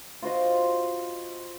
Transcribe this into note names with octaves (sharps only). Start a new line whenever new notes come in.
F4 F#4 C5 D#5